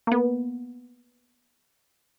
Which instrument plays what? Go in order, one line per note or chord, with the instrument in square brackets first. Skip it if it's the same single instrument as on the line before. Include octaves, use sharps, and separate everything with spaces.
[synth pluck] A#3 B3